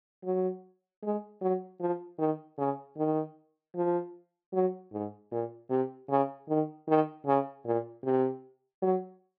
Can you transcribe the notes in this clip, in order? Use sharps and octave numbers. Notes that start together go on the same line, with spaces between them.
F#3
G#3
F#3
F3
D#3
C#3
D#3
F3
F#3
G#2
A#2
C3
C#3
D#3
D#3
C#3
A#2
C3
F#3